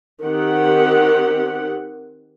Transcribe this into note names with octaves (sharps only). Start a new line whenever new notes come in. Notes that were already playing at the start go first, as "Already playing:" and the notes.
D#3 C4 G4 F#5